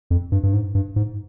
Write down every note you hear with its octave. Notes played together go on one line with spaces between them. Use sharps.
F2
G2
G2
G#2
G2
G#2